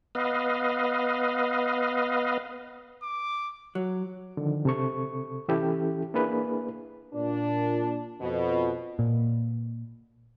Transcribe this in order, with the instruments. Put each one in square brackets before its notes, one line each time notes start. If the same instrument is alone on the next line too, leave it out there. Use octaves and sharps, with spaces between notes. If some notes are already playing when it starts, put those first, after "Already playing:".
[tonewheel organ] B3 B4 D#5 F5
[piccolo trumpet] D6
[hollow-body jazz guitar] F#3
[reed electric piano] D3 D#3 F3
C3 A4 C#6
E3 C#4 E4 G4 A4
A#3 D4 E4 G#4 B4
[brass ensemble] A#2 D4
F2 B2
[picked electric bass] A#2